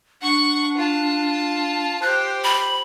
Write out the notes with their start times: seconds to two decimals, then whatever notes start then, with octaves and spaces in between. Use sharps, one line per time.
0.22 D4 F#5 C#6
0.77 F4 A5
2.02 G4 C5 F#6
2.44 B5